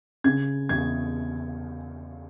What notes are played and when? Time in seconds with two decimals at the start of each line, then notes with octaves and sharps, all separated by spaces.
0.24 C#3 G#6
0.69 E2 G#6